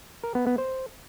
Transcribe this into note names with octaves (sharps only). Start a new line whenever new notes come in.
A#4
B3
B3
C5